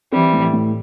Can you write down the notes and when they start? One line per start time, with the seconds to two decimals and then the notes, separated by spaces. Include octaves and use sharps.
0.12 E3 G3 C4
0.33 A2
0.53 A2